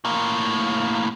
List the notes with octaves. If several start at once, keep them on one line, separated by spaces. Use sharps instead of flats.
A2 A#3